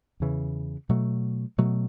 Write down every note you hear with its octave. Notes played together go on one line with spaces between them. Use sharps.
E2 C#3 E3
B2 F#3 A3
B2 F#3 A3